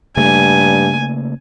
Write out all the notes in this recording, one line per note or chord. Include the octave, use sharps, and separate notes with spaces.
G2 C#3 A3 A#3 G#5